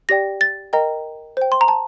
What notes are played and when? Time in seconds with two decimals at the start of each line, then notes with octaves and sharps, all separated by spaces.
0.09 G4 D5 G5 A#6
0.41 A6
0.73 A#4 D#5 G5 A#5
1.37 C5 G5
1.52 C6
1.61 A#5
1.68 A5